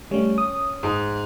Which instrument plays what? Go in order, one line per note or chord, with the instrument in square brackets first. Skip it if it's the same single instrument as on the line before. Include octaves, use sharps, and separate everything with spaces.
[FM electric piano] G3 A3 [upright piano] C#4
[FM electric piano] D#6
[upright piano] G#2